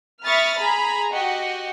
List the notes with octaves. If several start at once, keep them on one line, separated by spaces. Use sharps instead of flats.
E5 B5 C#6 D#6 F6 A6
G#4 A#5 B5
F#4 G4 D#5 F#5